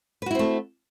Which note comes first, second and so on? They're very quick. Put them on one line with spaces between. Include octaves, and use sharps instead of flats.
B4 F#4 E4 C4 A3